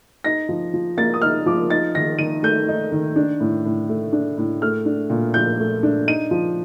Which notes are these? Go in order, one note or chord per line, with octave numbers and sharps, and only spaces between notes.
D#4 A#6
F3
F3
A#3 A6
D#6
D#4 F6
F3 D6
D#4 A6
D#3 A#6
D#3 D#7
A3 G6
D#4
D#3
D4
A2
A2
A3
D4
A2
A3 F6
D4
A#2
F3 G6
A3
D4
D#4 D#7
F3